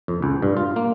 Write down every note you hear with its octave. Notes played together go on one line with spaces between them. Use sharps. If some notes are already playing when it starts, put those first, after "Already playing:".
F2
C#2
G2
F4
A#3